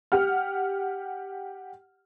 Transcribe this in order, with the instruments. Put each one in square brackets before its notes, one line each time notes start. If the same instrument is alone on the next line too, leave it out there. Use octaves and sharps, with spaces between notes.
[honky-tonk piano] G4 F#5 F6